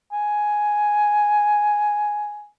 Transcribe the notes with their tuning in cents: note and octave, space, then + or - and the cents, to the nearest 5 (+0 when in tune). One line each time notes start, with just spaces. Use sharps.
G#5 +5